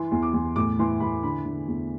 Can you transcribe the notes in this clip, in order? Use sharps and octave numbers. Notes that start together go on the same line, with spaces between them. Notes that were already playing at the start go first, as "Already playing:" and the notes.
Already playing: E3 C6
E2
D6
E2
A2 D6
E3 C6
E3 B5
D3 B5
D3
E2